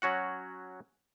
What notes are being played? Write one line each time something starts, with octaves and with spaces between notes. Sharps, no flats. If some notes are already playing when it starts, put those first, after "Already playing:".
F#3 C#4 F#4 F#5